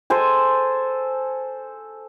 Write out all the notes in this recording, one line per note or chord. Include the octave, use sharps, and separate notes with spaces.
A4 C5 G#5